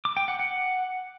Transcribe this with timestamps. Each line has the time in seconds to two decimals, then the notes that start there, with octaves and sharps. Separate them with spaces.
0.05 D6
0.17 G5
0.28 F#5
0.39 F#5